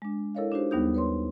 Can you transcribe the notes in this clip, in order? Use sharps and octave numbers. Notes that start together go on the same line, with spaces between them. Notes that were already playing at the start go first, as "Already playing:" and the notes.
G#3 D4
E4 A4 A#4 C#5 D#5 F5
D4 D#4 F#4 G4 C5
D#2 G3 B3 D#4 D#6 G6
B4 C#5 C6